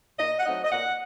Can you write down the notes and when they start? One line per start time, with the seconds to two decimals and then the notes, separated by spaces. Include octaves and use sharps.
0.19 A#2 D#5
0.39 F#5
0.45 F#3 A3 C4 D#4 D#5
0.64 D#5
0.71 A#2 F#5